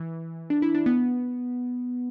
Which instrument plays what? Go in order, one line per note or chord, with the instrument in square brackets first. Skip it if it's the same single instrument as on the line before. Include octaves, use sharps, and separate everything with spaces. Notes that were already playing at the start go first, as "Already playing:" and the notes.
Already playing: [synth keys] E3
D4
E4
D4
B3